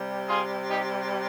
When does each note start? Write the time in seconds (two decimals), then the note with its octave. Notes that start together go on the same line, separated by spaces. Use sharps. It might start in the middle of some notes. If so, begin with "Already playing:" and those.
Already playing: C3 G3
0.29 F4 G#4
0.68 D#4 G4